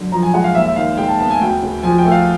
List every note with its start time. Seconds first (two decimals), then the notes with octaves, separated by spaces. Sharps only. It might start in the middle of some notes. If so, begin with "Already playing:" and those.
Already playing: F#2 D3
0.12 F3 A#5
0.23 G#5
0.34 G#3 F#5
0.44 F5
0.55 D#2 E5
0.66 E5
0.76 D#3 F5
0.97 G#3 G5
1.08 A5
1.19 B3 A5
1.30 G#5
1.41 D2 G5
1.62 C#3
1.83 F3 G#5
1.98 G5
2.05 A3
2.11 F5